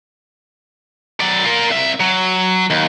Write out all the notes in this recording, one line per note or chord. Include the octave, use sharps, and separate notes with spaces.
F#3 D5
F4 A#4
C2 E5
F#3
D#2